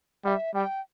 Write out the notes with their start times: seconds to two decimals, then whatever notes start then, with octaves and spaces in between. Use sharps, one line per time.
0.24 G3 E5 G5
0.55 G3 G5